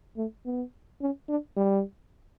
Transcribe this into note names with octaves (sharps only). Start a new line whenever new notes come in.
A3
B3
C#4
D4
G3